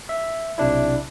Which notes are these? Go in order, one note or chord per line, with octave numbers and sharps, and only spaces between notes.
E5
B1 C3 D4 E4